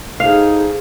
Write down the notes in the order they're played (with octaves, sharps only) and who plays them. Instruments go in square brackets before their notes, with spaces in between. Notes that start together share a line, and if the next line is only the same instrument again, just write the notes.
[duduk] D#4 [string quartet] G#4 A4 C5 [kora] F5